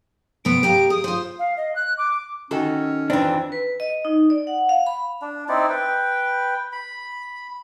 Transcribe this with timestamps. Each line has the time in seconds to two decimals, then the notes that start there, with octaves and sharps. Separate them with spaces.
0.45 C3 B3 D7
0.63 G4 A#4 F5
0.90 G#4 D#6
1.04 F4 C5
1.39 F5
1.57 D#5
1.75 F#6
1.98 D6
2.51 D#3 C#4 F#4 A4
3.10 F2 E3 C4 D4
3.52 B4
3.80 D#5
4.05 D#4
4.30 D5
4.47 F#5
4.69 F5
4.87 B5
5.22 D4
5.49 C4 D#4 E4 D5
5.69 B4 G5
6.73 B5